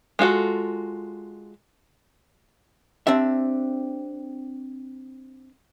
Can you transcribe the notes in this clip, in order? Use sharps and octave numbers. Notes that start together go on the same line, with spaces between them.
G#3 F4 F#4 A4
C4 D4 G4 E5